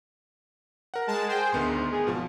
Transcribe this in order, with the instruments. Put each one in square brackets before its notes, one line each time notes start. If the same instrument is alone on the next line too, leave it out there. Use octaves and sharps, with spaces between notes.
[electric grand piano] A#4 F#5
[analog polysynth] G#3 A5
G#4 C5 G5
[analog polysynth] D2 G#2 [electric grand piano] D#3 B3 C6
[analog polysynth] G#4
[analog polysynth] G#1 [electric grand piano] B2 F3